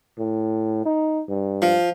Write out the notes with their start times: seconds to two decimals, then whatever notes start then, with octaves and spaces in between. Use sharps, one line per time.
0.19 A2
0.86 D#4
1.29 G2
1.62 F3